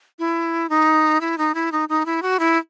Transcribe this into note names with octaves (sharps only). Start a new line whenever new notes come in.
E4
D#4
E4
D#4
E4
D#4
D#4
E4
F#4
E4